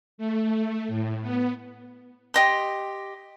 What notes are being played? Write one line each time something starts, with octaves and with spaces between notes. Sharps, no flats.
A3
A2
B3
G4 D#5 C6